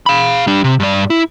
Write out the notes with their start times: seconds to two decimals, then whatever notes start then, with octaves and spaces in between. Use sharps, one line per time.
0.06 F5 B5
0.47 G3 D4
0.64 C3
0.80 G2 D5
1.10 E4